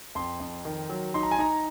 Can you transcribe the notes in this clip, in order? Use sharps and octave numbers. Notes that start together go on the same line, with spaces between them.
F2 C6
F2
D#3
F#3
D#4 C6
A#5
G#5
D#4 A#5